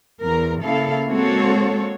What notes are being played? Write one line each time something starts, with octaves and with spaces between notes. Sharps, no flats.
E2 A#4
C#3 A#3 E4 A4 F5
G#3 A#3 C4 F#4 A4 C#5